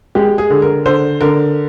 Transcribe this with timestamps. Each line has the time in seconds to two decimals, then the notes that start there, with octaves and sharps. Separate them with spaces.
0.15 G#3 G4
0.38 G#4
0.50 D3
0.62 A#4
0.85 D3 C5
1.21 D3 A#4